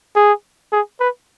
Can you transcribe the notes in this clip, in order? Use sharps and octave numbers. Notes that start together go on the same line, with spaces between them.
G#4
G#4
B4